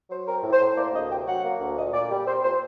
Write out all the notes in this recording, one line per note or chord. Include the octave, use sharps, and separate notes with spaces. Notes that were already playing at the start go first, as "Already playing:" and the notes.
F#3 C5
C4 A#4
A2
C5
A2
C5
A#3 D5
D2 D#5
C3 G5
F#3 F#5
A#3
D2
A#2 D#5
A#2 D5
G3
C4 C5
A#2 C5